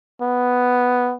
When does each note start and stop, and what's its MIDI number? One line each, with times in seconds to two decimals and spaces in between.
0.22 1.15 59